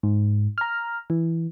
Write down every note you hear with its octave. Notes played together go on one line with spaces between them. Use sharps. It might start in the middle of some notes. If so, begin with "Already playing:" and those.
G#2
A#5 F6
E3